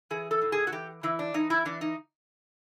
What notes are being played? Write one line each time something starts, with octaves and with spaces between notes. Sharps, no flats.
E3 G#4
A4
A2
G#4
F#4
E3 G4
E3 E4
D4
E3 D#4
E4
E3 D4
D#4